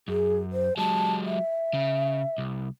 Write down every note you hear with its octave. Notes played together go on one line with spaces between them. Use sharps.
F#2 G#4
C5
F#3 G#3 A5
E5
C#3
C2